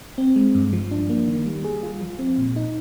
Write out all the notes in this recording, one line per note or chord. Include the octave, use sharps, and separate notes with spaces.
C4
G#3
G2
F3
D4
A#3
D#3
G3
G#4
F4
F3
C4
A#2
D#4